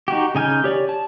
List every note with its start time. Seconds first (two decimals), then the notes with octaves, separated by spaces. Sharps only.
0.08 D#4 F#4 G4
0.35 C#3 D#4 G#5 F6 G6
0.64 G4 C#5 D5
0.89 A5